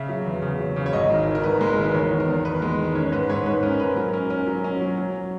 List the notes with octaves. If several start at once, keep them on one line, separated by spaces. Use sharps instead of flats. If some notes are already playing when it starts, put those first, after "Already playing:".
Already playing: C#3 E5
F#3
E2
C#3
F#3
C#3
C#5
G#1 D#5
D#3
D#3
A#4
G#1 B4
G#3
D#3 A#4
B4
E2 C#5
D#3
A#4
E2
E2 B4
G#3
D#3
C#4 C#5
G#2 B4
G#2 C#5
G#2 B4
C#4 A#4
G#2 B4
F#3 A#4
C#4 A#4
C#4 A#4
F#3
C#4
F#3
F#3